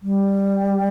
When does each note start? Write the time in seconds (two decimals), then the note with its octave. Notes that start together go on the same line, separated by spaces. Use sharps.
0.02 G3